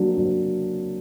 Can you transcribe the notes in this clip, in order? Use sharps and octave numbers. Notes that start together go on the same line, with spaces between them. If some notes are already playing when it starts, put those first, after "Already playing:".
Already playing: F#3 A#3 D4
F#3